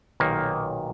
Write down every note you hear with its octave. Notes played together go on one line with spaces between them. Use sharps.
B1 A#2 D#3 A#3